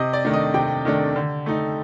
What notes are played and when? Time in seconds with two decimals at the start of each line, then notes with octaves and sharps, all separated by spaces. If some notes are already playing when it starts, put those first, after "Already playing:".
Already playing: C3 D#5
0.13 D5
0.25 D#3 A3 D4
0.34 D#5
0.54 C3 G5
0.85 D#3 A3 D4
1.16 D3
1.46 A3 D#4